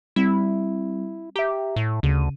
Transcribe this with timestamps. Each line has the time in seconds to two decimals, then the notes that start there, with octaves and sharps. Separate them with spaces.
0.16 G3 C4 E4
1.36 G4 E5 A#5
1.76 A2
2.03 D2 C#3 D#7